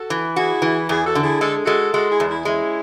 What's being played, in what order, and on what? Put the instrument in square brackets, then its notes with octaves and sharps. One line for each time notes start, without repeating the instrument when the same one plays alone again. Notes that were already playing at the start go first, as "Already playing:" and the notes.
Already playing: [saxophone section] F#4 A4
[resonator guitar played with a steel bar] E3
[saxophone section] E4 G#4 [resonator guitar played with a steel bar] F#4
[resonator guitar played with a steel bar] E3
[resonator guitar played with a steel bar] E2 [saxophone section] E4 G#4
[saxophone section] F#4 A4
[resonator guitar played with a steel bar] D3
[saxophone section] E4 G#4
[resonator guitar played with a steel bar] G#3 [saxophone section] A4
[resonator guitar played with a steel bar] G#3 [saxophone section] F#4 A4
[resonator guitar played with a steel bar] G#3 [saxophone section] F#4 A4
[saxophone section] E4 G#4
[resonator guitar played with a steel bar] E2
[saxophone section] E4 G#4
[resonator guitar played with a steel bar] G#3 [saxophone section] C#4 E4